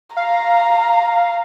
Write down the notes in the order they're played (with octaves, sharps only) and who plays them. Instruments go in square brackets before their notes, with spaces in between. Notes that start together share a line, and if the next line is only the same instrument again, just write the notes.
[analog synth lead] F5 [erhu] A#5